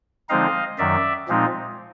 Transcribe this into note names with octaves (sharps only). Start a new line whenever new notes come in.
D3 F3 G#3 C4 D#4 D#5 F5
F#2 D#3 F#3 D5 E5
A#2 F3 G#3 C4 D#4